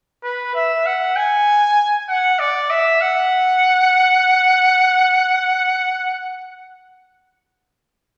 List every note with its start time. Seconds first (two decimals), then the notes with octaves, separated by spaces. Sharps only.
0.23 B4
0.55 E5
0.86 F#5
1.16 G#5
2.09 F#5
2.39 D5
2.70 E5
3.01 F#5